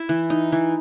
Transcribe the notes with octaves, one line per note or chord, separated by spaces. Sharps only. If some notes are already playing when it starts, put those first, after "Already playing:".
Already playing: E4 E5
E3
D#4
E3